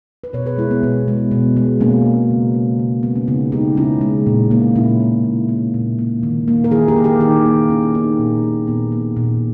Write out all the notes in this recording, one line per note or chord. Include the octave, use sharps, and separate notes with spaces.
B4
B2 A#4 C#5
G#4 B4
G#3 E4 G#4
B3
B2 B3
G#3
B2
G#3
B2 A#3 C#4
G#3
C#3
G#3
C#3
G#3 B3
C#4
C#3 B3 D#4
G#3 D#4 G4
C#3 C#4 E4
G#3
A#2
A#3
A#2 C#4 E4
A#3
A#2
A#3
A#2
A#3
D#3
A#3
A#4
D#3 E4 G#4
G4 A#4
A#3
G4 A#4
D#3 D#4 G4
A#3
D#3 C#4 E4
C#4
A#3 B3 D#4
A#2
A#3
A#2 B3
A#3
A#2